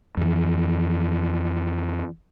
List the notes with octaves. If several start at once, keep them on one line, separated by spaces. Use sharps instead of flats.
F2 E3